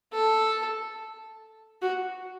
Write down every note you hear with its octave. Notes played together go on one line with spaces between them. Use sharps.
A4
F#4